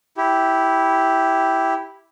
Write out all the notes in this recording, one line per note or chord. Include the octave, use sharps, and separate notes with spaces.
E4 G4